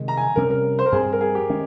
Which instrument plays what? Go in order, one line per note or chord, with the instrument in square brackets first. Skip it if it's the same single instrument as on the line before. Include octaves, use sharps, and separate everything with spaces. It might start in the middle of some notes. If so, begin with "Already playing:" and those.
Already playing: [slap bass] C3 D#3 G#3
[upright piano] A#5
G#5
[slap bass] C3 G3 C#4 [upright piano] A#4
[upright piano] A#4
C5
A#4
[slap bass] G2 G3 C4 [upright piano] G#4
[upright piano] A#4
G#4
G4
[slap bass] D#3 G#3 C#4